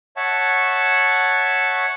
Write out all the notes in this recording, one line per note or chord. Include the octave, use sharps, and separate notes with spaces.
C#5 E5 F#5 A5 C#6